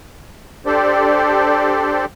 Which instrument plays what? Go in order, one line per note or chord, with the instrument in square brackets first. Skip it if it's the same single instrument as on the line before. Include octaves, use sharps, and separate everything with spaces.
[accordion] D4 G4 A4 C5 D5